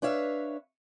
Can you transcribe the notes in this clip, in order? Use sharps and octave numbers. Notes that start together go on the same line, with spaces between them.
D4 B4 C#5 E5 F5